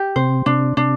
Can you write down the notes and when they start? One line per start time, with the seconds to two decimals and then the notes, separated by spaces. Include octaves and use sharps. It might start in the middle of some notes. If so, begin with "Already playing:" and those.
Already playing: G4
0.16 C3 C5
0.46 C3 D4
0.77 C3 D4